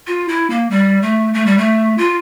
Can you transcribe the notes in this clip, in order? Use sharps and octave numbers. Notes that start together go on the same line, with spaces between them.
F4
E4
A#3
G3
A3
A3
G3
A3
F4